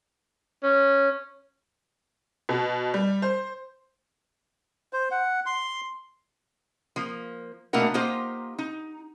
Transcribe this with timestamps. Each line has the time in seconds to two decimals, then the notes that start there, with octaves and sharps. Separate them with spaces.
0.63 C#4
2.49 B2
2.94 G3
3.22 C5
4.93 C5
5.11 F#5
5.46 C6
6.96 F3 A#3
7.73 B2 A3 A#3 D4 A#4 F#5
7.94 A#3 D#4 F4 G4 C5
8.59 D#4